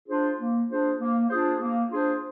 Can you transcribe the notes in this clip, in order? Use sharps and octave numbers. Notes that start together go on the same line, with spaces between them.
D4 F4 G#4 C5
A#3
D4 F4 G#4 C5
A#3
D4 F4 G#4 C5
A#3
D4 F4 G#4 C5